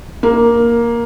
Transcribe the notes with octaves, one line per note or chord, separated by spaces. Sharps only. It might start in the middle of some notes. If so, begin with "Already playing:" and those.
A#3